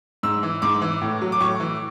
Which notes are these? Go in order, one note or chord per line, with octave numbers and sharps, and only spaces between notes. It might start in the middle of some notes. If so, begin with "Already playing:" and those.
G#2 E6
E3
G#2 D6
E3
A2
F#3
D6
A2 C#6
E3